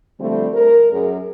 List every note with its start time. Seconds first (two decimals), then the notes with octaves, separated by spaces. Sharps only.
0.19 D3 F3 G3 A3 C4
0.54 A#4
0.92 F#2 G#4